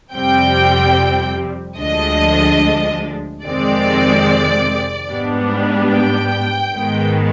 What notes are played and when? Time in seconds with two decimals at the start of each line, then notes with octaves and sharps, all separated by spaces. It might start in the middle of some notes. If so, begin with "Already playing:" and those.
0.13 F2 C3 G3 C4 G5
1.78 D2 D3 F3 G#3 D4 D#5
3.44 F2 C3 D#3 G#3 C4 D5
5.10 G#2 G3 B3 D4
5.92 G5
6.75 G#2 D#3 G#3 B3